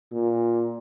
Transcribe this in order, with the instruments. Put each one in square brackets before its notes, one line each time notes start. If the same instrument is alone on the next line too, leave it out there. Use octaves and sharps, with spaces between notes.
[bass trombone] A#2